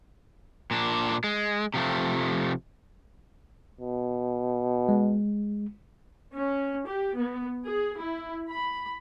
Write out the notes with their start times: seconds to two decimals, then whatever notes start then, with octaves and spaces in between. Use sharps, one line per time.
0.71 A#2 D4
1.24 G#3
1.74 C3 F3 A3
3.80 B2
4.89 G#3
6.37 C#4
6.87 G4
7.17 B3
7.67 G#4
7.99 E4
8.50 B5